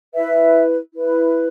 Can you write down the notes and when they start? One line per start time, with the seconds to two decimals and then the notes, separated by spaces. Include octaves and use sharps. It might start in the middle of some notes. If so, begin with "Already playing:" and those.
0.14 E4 B4 E5
0.94 E4 B4